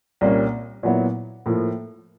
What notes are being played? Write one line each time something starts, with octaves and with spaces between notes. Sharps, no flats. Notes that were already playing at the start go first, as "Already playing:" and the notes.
C2 A#2 G3 A#3 C#4
A#2 F#3 B3 E4
A2 F3 A#3